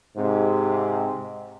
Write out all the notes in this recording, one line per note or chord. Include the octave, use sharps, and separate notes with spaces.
G#2 C3